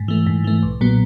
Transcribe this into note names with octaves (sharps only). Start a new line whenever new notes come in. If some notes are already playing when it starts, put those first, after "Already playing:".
Already playing: G#2
E3 A3
G#2
E3 A3
B1
A#2 F#3 B3